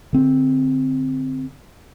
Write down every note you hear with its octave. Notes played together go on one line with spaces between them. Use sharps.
D3 C4